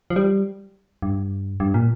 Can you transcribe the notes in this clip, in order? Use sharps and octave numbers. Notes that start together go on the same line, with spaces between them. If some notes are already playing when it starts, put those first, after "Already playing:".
F3
G3
G2
G2
A#2